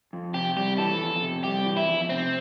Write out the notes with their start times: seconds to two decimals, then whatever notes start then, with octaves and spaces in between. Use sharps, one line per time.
0.13 F2
0.34 C3 G4
0.56 G3 G4
0.78 E3 A4
1.01 F2
1.22 C3
1.44 G3 G4
1.66 E3
1.77 E4
1.88 F2
2.10 C3 C4